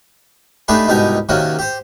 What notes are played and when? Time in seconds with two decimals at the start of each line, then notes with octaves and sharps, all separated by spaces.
0.68 A3 D4 D#4 G4 G#4 B4
0.88 C2 G#2 B2 D#4 G4 G#5
1.29 C3 D#3 A#3 C#4 F#4
1.59 G4 C5